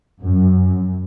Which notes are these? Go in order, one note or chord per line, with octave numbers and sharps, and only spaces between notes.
F#2